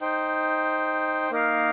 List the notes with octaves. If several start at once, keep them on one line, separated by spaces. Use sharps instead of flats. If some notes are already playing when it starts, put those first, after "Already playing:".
D#4 C5 G5
A#3 D#4 A#4 F5